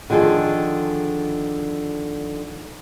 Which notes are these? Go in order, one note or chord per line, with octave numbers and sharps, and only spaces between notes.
D3 D#3 F3 G#4 A4